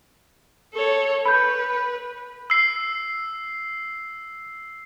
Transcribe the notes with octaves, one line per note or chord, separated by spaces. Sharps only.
A4 C#5
B4 B5 G6
E6 C7